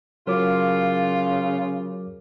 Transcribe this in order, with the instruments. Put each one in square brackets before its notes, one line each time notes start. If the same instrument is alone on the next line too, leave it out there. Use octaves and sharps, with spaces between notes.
[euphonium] C#3 [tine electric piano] F#3 C#5 D6 [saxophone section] F4 [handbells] A#4